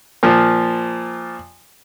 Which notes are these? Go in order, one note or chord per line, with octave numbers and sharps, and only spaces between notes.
A#2 F3